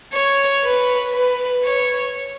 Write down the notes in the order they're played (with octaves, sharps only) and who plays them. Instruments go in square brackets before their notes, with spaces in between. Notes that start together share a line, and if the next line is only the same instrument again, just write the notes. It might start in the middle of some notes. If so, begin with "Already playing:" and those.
[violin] C#5
B4
B4
C#5